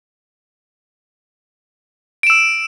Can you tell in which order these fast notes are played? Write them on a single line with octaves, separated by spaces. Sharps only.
D7 E7 E6